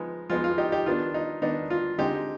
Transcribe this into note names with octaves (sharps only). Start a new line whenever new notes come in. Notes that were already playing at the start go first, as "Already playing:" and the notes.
Already playing: F3 G#3 B3 D#4
F3 G#3 B3 D#4 F4
F4
D#4 G4
D#4 G4
D#3 B3 D4 F4
D#4
D#3 B3 D4 D#4
F4
D3 G#3 C4 D#4 G4